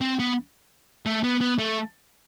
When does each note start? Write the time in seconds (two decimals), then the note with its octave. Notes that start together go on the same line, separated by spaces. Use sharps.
0.01 C4
0.19 B3
1.06 A3
1.23 B3
1.41 B3
1.58 A3